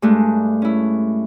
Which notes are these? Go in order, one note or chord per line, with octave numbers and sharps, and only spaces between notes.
G2 G#3 A3 D4
C#4 E4